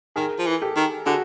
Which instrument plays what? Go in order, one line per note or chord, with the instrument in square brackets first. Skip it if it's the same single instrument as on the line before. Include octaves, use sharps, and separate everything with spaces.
[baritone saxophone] D#3 [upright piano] G#4 A#4
[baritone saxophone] F3
E3
[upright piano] G4 A4
[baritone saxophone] D#3
[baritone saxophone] D3 [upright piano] F#4 G#4